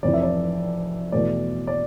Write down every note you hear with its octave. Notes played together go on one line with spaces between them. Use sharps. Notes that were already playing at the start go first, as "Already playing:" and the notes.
F1 F2 C3 E3 D5
E5
D5
E2 B2 A3 D5
D5